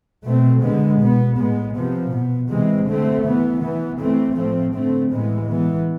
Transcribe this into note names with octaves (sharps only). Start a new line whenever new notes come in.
B2 A3 C4
D3 G#3 B3
B2 B3
A2 G#3 B3
C3 F3 B3
B2 B3
C3 E3 G#3 C4
D3 A3 C4
E3 B3
E3 B3
E3 A3 C4
A2 F3 A3 C4
D3 A3 C4
A2 E3 G#3 B3
E3 B3